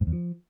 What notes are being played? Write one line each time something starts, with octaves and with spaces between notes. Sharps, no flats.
G#2
E2
F3